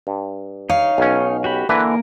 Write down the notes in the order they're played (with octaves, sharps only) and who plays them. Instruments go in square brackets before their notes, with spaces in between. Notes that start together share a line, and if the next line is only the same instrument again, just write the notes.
[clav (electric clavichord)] G2
[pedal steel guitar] D#4 C#5 [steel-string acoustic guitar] F5
[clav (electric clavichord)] B1 C#4
[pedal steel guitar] F#4 G4 B5
[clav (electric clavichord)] D3 E3 B4 [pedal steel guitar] A#3 A#4